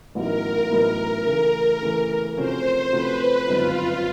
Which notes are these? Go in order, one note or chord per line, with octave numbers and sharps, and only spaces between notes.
A1 A2 F#3 B3 D#4 A#4
A1 A2 F#3 B3 D#4
C#3 E3 A3
C#3 E3 A3
C3 F3 A3 C#4 F#4 C5
C3 F3 A3 C#4 F#4 B4
G1 F#2 D#3 G#3 C4 F4